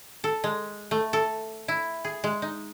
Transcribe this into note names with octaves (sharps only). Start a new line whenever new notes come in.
A4
G#3
A3
A4
E4
G#4
G#3
D#4